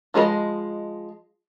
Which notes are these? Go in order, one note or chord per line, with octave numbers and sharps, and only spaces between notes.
F3 G#3 G#4 D#5 B5